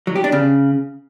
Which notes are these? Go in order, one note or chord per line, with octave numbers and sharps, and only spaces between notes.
F#3
G4
D4
C#3